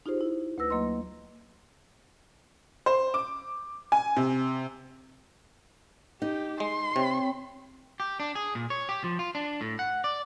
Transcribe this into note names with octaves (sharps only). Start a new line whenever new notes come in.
D#4 F4 G4 G#4 C5
E4
D2 A3 B4 E6 A#6
F#3 A#3 D#5 C6
C5
D6
G#5
C3
D#4 G4
G#3 C6
C3 C4 C#5 G5
G4
D4
G#4
A#2
C#5
G4
F3
F4
D4
A2
F#5
D5